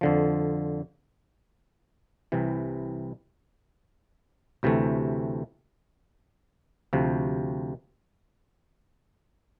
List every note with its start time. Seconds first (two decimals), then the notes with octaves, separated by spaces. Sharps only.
0.01 F2 D3 F3
2.32 C2 C3 E3
4.63 D2 C3 E3 A3
6.93 D2 C3 F3